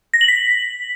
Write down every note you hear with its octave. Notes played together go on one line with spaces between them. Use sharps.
A#6
F#7
B6